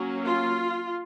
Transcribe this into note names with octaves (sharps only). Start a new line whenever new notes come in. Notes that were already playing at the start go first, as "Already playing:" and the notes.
Already playing: F#3 A#3 C#4
F4